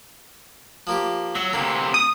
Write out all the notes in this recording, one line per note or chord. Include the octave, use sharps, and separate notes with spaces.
F3 A#3 G4
F#3 E5
D2 C3 E3 A#3
D#6